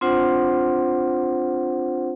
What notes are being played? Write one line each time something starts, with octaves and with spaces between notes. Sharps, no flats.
C4 D4 F4 C5 F#5